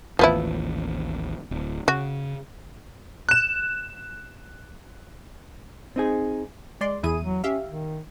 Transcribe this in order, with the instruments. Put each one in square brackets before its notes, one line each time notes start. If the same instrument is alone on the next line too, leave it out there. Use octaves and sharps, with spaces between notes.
[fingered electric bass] A1 D#2 [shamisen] F3 B3 E4
[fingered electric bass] D1
[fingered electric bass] C#3 [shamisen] F#4
[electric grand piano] F#6 E7
[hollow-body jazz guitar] C4 D#4 G#4
[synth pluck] G#3 D5 C6
[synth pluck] E2 E4 D#7 [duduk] G#4
[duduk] F#3
[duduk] C#4 [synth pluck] G4 E5 F5
[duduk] D#3